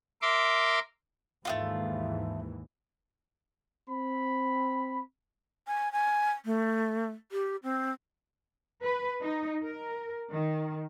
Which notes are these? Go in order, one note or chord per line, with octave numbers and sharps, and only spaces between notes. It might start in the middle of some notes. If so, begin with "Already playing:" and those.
A#4 E5 C6 D6
D#2 G#2 E3 A3 B3 F4
C4 B5
G#5
G#5
A3
G4
C4
B4
D#4
A#4
D#3